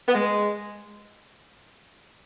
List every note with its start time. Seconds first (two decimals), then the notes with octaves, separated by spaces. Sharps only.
0.09 B3
0.15 G#3